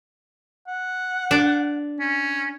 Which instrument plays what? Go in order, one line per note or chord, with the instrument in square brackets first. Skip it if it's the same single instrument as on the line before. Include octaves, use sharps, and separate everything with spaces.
[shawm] F#5
[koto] D4 D5
[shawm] C#4